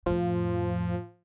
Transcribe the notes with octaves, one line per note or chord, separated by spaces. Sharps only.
F2 A2 F3